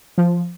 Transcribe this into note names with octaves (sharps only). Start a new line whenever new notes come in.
F3